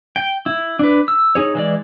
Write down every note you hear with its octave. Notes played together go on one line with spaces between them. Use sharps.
G5
E4
D4 B4
E6
D#4 G#4 C#5
E3 G#3 D5